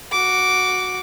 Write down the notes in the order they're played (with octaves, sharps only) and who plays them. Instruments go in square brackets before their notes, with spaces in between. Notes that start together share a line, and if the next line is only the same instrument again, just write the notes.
[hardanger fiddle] F#4 D6